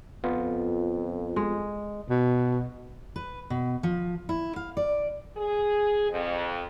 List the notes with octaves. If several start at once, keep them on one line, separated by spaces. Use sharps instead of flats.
F2 B3 F4
G#3
B2
B4
B2
F3
E4
F5
D5
G#4
F2